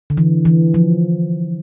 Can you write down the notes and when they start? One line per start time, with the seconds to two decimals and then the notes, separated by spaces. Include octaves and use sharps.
0.10 D3
0.17 E3
0.45 E3
0.74 F3